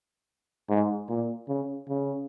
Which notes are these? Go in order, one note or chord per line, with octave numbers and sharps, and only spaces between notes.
G#2
A#2
C#3
C#3